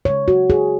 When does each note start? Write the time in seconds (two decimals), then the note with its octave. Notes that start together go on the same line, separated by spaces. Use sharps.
0.05 C#3 G#3 C#5
0.28 F#4
0.50 G#4